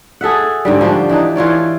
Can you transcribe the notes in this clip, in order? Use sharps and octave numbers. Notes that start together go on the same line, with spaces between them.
G#4 A4 E5 F#5
G#2 D3 G3
F3 D4 F#4 G4
E3 D4 D#4
E3 F4 C#5 D5